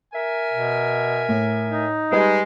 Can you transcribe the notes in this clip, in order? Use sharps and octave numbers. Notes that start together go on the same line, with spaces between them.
A#4 E5 G#5
B2
A2
D#4
G3 G#3 B4 D#5